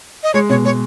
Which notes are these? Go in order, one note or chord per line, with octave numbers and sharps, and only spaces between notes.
D#5
G#3 C#5
B2 C#5
G#3 C#5